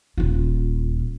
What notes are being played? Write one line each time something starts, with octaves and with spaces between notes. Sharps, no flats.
D#1 F4